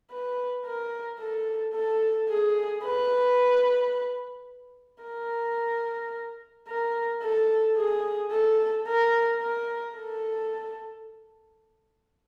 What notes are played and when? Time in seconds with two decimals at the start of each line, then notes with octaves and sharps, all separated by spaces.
0.11 B4
0.65 A#4
1.19 A4
1.74 A4
2.29 G#4
2.84 B4
5.03 A#4
6.68 A#4
7.23 A4
7.77 G#4
8.32 A4
8.87 A#4
9.42 A#4
9.96 A4